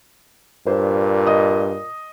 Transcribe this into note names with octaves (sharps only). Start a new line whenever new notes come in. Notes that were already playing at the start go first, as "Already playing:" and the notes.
G2 A#2 C5
D#5 D#6